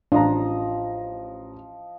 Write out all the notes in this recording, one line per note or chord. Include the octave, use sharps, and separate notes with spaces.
A1 F3 D4 D#5 A#5